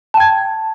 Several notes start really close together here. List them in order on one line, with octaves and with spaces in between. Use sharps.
A5 G5 G#6